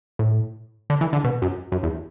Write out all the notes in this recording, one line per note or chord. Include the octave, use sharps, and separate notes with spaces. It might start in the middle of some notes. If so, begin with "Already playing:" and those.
A2
D3
E3
D3
B2
F#2
F#2
E2